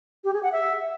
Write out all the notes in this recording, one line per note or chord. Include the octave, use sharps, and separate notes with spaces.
G4
G#4
F#5
E5